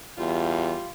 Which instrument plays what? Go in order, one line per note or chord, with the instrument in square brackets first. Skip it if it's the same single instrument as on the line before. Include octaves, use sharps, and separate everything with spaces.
[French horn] E2 [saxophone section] G3 F4